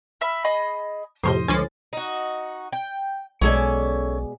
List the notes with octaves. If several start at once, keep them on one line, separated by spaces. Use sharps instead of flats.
E5 B5 E6
G#4 D#5 B5
F2 A2 C3 C5 C#5 D#5
C#2 D3 F3 C#4 G#5 A6
D#4 F#4
G5
B1 B2 G#3 C#4 A4 D5 G#5